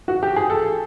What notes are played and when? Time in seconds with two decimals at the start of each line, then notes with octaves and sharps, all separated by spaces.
0.08 F#4
0.23 G4
0.36 G#4
0.50 A4